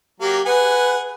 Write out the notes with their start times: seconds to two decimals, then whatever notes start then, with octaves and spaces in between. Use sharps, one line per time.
0.21 F#3 A#3 G4
0.46 G#4 B4 F#5 G#5